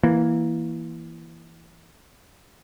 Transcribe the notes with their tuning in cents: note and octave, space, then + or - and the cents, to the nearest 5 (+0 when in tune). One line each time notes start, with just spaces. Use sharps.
E3 +0 A#3 +10